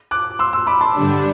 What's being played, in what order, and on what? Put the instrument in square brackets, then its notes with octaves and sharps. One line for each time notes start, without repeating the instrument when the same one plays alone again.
[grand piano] D6 F#6
C6 E6
C6 E6
B5 D6
A5 C6
[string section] G2 D3 G3 D4